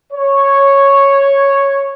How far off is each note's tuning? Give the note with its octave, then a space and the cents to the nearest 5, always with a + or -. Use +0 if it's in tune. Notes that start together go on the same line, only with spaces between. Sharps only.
C#5 -5